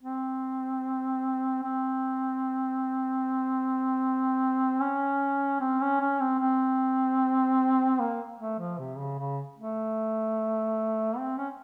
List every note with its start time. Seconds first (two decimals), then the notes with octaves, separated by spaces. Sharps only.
0.03 C4
1.63 C4
4.80 C#4
5.60 C4
5.81 C#4
6.01 C#4
6.20 C4
6.39 C4
8.00 A#3
8.40 A3
8.59 F3
8.79 C3
8.99 C#3
9.19 C#3
9.58 A3
11.17 C4
11.38 C#4